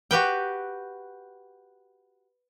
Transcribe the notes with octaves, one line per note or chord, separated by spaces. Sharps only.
F#4 G4 B4 G5